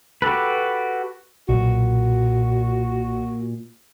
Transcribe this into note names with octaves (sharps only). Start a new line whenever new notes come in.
F#4 G4 A4 B4
B1 A#2 F#4